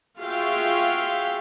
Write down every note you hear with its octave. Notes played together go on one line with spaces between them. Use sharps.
F4 F#4 G#4 E5 F5 G5